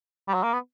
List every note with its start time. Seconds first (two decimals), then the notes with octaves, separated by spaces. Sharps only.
0.28 G3
0.34 F#3
0.43 A#3
0.53 B3